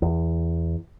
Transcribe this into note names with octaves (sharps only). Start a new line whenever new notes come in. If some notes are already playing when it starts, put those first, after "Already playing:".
E2